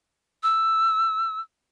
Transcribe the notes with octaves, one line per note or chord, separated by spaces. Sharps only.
E6